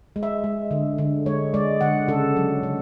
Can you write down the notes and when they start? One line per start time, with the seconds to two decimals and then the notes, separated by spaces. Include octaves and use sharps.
0.16 G#3
0.23 E5
0.44 G#3
0.71 D3
0.98 D3
1.26 G#3 C#5
1.54 G#3 D5
1.81 D3 F#5
2.08 C#3 A4
2.37 F#3
2.63 C#3